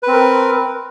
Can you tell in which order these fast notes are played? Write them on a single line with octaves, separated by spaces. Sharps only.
B4 C4 A#4